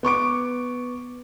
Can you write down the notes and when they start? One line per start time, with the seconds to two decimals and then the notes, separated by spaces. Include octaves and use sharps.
0.03 B3 C#6 D6 D7